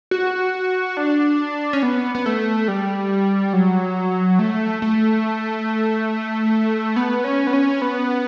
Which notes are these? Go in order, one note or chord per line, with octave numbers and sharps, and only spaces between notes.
F#4
D4
C#4
B3
B3
A3
G3
F#3
A3
A3
B3
C#4
B3
C#4
B3